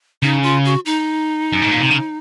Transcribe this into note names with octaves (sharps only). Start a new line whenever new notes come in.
C#3 D#4
F4
F#4
D#4
F#2
G#2
A#2
C3
C#3